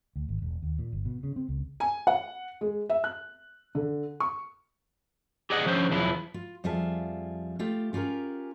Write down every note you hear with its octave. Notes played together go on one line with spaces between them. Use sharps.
D2
G#1
E1
D#2
A#2
G1
B2
C#3
C4
C#2
G#5
F#5
G#3
E5
F#6
D3
C#6
G4 G#4 D5 D#5 F#5
D3 F3 C#4 C5
B1 E2 F3 E4
F4
F2 G3 F4 G#4 E5 A5
A3 F4 G4
C#4 F4 G4 G#4 A#4